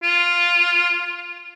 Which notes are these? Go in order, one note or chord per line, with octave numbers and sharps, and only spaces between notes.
F4